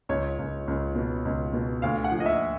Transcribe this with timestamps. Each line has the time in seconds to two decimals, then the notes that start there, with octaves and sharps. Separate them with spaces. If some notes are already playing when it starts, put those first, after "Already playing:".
0.09 C#2 C#5
0.39 C#2
0.68 C#2
0.95 B2
1.25 C#2
1.53 B2
1.82 D2 F5
2.04 F#5
2.12 F3
2.20 D#5
2.26 E5